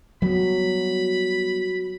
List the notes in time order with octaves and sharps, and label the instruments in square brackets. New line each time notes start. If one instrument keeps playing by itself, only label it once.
[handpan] F#3 [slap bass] G3 B3 [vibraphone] F#4 [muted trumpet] B5